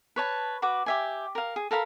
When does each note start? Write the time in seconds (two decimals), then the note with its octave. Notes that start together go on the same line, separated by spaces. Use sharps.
0.16 B4 C#5 A5
0.62 F#4 B4 D6
0.86 G4 E5 G#5
1.35 A#4 F5
1.56 G#4
1.71 A4 A#4 F5 B5